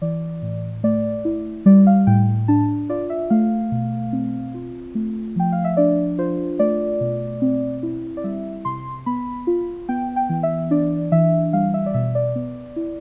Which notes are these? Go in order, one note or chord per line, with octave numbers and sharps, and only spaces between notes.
E3 D5
A2
A3 D5
E4
G3 D5
F5
A2 G5
D4 A5
F4 D5
E5
A3 F5
B2
C4
F4
A3
F3 G5
F5
E5
D4 D5
F4 C5
A3 D5
B2
C4
E4
D5
G3 E5
C3 C6
B3 B5
F4
B3 G5
G5
E3
E5
D4 D5
E3 E5
G3 F5
E5
D5
B2 E5
D5
B3
E4